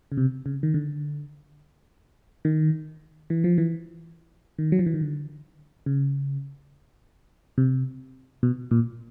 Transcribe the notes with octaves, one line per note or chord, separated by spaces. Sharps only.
C#3
C3
C#3
D#3
D3
D#3
E3
F3
E3
D#3
F#3
F3
E3
D#3
D3
C#3
C3
B2
A#2